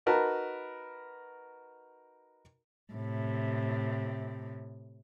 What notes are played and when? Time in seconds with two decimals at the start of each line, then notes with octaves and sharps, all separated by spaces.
0.06 D#4 F#4 A#4 B4 A5
2.93 A2 C3